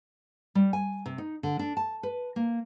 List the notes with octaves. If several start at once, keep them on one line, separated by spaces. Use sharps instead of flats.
G3
G#5
C3
D#4
D3
D4
A5
B4
A#3